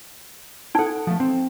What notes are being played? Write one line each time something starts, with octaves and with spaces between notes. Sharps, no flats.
D#4 A4 F#5 G5
F3 A3
C4